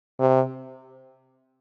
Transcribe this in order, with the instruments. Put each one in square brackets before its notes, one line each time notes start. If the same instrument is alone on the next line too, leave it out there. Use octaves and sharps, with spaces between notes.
[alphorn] C3